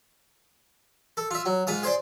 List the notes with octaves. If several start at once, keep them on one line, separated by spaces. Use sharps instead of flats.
A4
F4 E5
F#3
G#2 F4 D#6
G#4 C5 D5